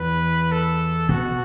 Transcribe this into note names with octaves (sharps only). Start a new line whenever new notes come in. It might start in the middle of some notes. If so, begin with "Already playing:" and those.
Already playing: E2 E3 B4
A4
B2 B3 F#4